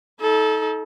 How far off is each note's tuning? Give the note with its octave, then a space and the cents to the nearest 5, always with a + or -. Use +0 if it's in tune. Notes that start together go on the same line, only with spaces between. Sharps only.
D#4 +35 A4 -20